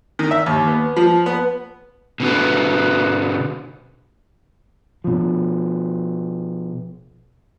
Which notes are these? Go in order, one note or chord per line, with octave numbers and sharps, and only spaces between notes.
D#3
E5
D#2
B3
F3
B3
B2 D3 B3
B2 F3